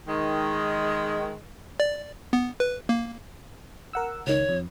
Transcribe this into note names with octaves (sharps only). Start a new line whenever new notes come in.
D#3 G#3
D5
B3
B4
A#3
A#4 F#5 E6
C#2 D#3 C#5
F2